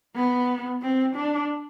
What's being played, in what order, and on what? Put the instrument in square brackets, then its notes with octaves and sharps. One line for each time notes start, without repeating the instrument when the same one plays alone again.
[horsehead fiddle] B3
C4
D4